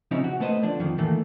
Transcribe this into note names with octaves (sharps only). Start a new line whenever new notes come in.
C#3 F3 C4 C#4 D#4 E4
F#4
A3 B3 B4 C5 D#5
D3 F3 D4
F2 D#3 F3
A2 D#3 E3 A3 A#3